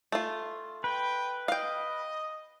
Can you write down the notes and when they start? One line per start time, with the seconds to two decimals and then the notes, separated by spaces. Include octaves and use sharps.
0.12 A3 F4
0.84 B4 G5
1.48 D#5 F5 G5